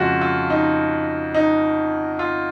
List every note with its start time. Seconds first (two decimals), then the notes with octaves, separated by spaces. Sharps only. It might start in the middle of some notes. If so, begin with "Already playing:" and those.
Already playing: F2 C#3 G#3 F4 F#4
0.21 F4
0.50 D#4
1.34 D#4
2.19 F4